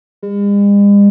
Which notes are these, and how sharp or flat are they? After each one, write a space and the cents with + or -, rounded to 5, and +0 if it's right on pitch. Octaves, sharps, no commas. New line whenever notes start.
G#3 -45